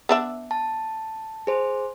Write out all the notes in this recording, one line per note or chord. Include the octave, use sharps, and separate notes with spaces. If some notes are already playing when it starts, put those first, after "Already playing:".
B3 D4 E5
A5
G#4 C5